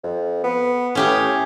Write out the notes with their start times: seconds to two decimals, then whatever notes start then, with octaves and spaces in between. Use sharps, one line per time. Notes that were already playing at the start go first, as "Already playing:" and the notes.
0.03 F2
0.44 B3
0.95 A2 C#4 G4 G#4